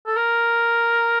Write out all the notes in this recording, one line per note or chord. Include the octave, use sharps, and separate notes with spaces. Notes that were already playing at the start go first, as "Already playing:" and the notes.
A4
A#4